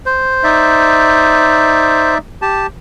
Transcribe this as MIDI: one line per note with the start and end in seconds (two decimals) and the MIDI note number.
0.06 2.15 72
0.44 2.18 63
0.44 2.18 74
0.44 2.18 76
2.42 2.67 67
2.42 2.67 81